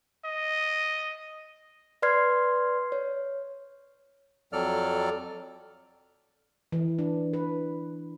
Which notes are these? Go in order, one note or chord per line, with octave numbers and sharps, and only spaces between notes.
D#5
B4 D5 C6 F6 G#6 C7
C#5
F2 F#3 A4 D5 F6
E3
D4
B4